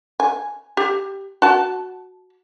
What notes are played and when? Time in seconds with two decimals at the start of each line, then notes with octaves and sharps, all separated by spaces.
0.20 G#5
0.77 G4
1.42 F#4 A5